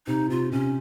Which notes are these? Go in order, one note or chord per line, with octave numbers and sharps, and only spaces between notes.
C3 D#4
C3 F4
C3 C#4